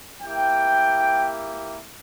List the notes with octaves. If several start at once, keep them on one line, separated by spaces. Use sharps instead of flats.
A#3 E4 G4 G5